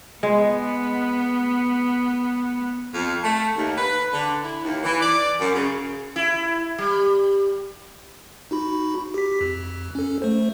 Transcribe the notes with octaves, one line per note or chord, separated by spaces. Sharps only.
G#3 B3
F2
A3
D#2
B4
D3
E4
D#2
E3
D5
F#2
C#3
E4
G3
D#4 F#4 B5
G4 B6
F2
C#4 A4
A3 C5